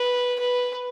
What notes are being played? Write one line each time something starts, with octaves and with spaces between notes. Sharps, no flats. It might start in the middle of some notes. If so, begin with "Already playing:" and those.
Already playing: B4
B4